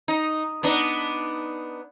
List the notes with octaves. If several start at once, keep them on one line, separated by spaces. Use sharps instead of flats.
D#4
B3 D4 D#4